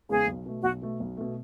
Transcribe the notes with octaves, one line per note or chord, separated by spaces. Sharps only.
E2 C#3 G#3 B3 G#4
B1
B2 A3
B1 F#4
B2 A3
B1
B2 A3